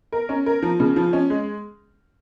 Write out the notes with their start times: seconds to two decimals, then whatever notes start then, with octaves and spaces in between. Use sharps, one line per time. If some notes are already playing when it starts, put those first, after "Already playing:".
0.12 A#4
0.29 C#4
0.46 A#4
0.63 F3
0.80 C#3
0.96 F3
1.13 C#4
1.30 G#3